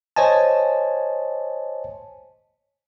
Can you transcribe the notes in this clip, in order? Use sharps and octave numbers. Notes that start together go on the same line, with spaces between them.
C5 C#5 D#5 G#5 A5